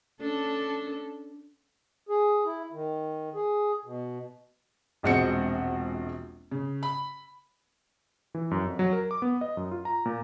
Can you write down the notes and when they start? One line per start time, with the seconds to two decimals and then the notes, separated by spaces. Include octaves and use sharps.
0.21 C#4 D4 A4
2.09 G#4
2.45 E4
2.72 D#3
3.35 G#4
3.85 B2
5.03 E1 A#1 G#3 C4 F#4 C#7
6.51 C#3
6.83 B5
8.35 E3
8.51 F#2
8.64 F2
8.79 F#3
8.93 A#4
9.11 D6
9.22 B3
9.41 D#5
9.57 F#2
9.71 F4
9.85 A#5
10.05 A#2